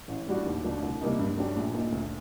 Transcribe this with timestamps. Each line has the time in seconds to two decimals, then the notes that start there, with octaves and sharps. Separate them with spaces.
0.08 A1
0.27 A2 G3 D4 F#4
0.46 D#2
0.64 D3 F#3 A3 D4
0.82 C2
1.01 C3 G3 A#3 D#4
1.19 G2
1.37 F#3 A3 D4 G4
1.56 A#1
1.73 A#2 A3 D#4
1.92 D2